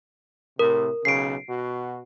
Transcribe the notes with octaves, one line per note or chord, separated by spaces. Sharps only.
A2 C3 A#4
B1 C#3 C7 D7
B2 F#4